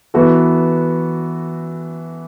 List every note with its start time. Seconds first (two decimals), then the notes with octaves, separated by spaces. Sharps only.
0.14 E3 B3 F#4 A4